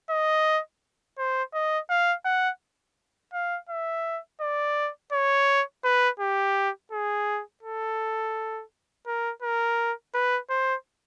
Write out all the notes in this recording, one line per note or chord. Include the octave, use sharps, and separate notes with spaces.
D#5
C5
D#5
F5
F#5
F5
E5
D5
C#5
B4
G4
G#4
A4
A#4
A#4
B4
C5